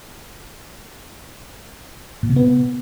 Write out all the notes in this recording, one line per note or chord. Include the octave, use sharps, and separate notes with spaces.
A#2
C3
B3